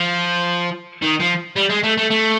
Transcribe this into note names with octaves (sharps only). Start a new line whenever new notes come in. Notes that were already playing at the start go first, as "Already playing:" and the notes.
Already playing: F3
D#3
F3
G3
G#3
A3
A3
A3